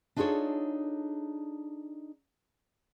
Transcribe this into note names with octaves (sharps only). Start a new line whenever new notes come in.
D4 D#4 F4 G#4 A4 C#5